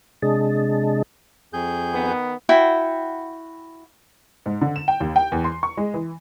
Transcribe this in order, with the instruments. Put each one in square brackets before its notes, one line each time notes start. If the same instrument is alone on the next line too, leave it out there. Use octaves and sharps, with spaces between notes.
[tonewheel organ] C3 G#3 D4 G#4 D#5 A5
[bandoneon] F2 G#4 G6
[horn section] D#3 B3
[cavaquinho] E4 F#4 F#5 G5
[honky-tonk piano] G#2
D3
E7
G5
D#2
G5
E2
C6
C#6
G#3
E3